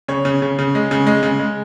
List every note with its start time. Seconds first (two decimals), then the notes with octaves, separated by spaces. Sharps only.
0.08 C#3 C#5
0.25 C#3
0.42 C#3
0.59 C#3
0.75 G#3
0.91 C#3
1.07 G#3
1.23 C#3
1.39 G#3